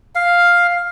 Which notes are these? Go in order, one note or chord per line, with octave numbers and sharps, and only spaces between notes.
F5